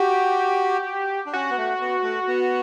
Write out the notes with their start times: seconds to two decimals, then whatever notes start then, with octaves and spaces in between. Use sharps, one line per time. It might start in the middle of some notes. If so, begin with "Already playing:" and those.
Already playing: F#4 G4
1.26 D4
1.33 C#4 F#4
1.50 B3
1.57 A3
1.80 B3
2.03 A3
2.27 B3